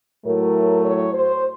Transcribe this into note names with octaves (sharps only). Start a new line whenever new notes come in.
A2 F#3 A3 A#4
C#5
C5